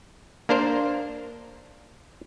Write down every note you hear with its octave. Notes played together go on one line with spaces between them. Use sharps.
A#3 D4 A#4 C5